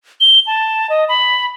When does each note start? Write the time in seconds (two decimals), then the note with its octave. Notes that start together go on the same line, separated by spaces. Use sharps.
0.20 G7
0.47 A5
0.90 D#5
1.09 B5